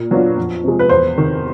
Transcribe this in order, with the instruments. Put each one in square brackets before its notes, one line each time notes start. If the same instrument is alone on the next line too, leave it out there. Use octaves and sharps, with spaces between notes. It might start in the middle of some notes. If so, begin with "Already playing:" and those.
Already playing: [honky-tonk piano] A#2
F#3 B3 D4 F4
F2
C3 F3 G#3
[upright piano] B4
[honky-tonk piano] E2 [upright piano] C5
[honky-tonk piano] C3 D#3